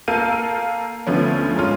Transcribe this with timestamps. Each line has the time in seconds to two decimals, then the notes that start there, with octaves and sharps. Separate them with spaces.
0.08 A#3 A4 F5 G6 D#7
1.07 D2 D3 F3 B3 C#4
1.56 G#2 G#3 C#4 F4